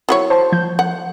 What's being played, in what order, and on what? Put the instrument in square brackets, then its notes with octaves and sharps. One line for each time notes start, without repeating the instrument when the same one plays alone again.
[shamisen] F#3 E4 C#5
[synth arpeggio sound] C5 A5 C6
F3 G6
[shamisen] F#5